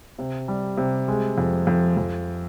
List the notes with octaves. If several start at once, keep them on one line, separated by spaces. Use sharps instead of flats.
C3
G3
C3
G#3
F2
F2
F2